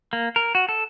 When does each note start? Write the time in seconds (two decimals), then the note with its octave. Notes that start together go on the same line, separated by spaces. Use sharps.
0.13 A#3
0.36 A#4
0.55 F#4
0.69 A4